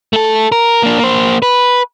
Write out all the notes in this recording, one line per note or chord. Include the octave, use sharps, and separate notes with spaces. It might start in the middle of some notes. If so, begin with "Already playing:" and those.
A3 A4
A#4
A#3 D4
A#3 C5
B4